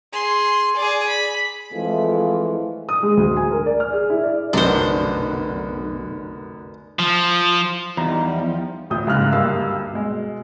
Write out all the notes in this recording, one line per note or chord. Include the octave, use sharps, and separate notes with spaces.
G#4 C6
G#4 D5
B5
F2 E3 G#3 A3 E4 F4
D#6
G#3
D2
G#5
A#4
D5
F6
G#4
E4
D5
F1 B1 F#2 D3 D#3 B3 D4 C5
F3
E2 F3 G3 D#4 A#5
A1 D2 F3 D#6 G6
F#1 G#2 C#3 F6 F#6
D2 G2 A#3 F5 E6
B2 G#3